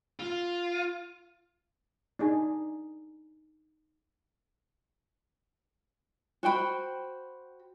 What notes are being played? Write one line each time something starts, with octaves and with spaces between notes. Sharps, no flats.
F4
D4 D#4 G#4
F#4 C5 G5 B5